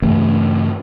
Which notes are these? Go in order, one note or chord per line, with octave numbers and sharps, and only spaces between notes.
G2 C#3 E3 A3